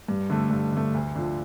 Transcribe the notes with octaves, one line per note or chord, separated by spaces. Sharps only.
G2
D3 A3
G2
D3 A3
D2
D3 F3